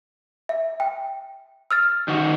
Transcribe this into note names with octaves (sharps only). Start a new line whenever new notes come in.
E5
G5
E6 F6 A6
D#3 F#4